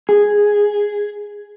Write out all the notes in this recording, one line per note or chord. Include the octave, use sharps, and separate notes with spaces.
G#4